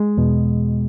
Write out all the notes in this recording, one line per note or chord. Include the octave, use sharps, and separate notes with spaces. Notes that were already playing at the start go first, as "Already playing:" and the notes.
Already playing: G#3
E2 B2